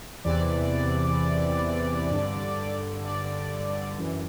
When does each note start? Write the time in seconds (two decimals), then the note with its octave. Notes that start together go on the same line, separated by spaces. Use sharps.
0.25 E2 C3 E3 D5
2.11 G2 D3
3.05 D5
3.98 F#2 E3